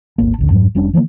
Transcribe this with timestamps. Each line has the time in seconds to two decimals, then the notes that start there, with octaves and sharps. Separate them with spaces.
0.18 D#1 G#1 A#3
0.38 G#1 D2 D3
0.50 F2 G#2 F#3
0.75 F1 G3 C#4 D4
0.93 D3 E3 F3 A#3